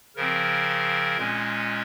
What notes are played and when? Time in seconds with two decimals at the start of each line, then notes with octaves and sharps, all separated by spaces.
0.16 C#3 F3 C4 A#4
1.17 A#2 G#3 C#4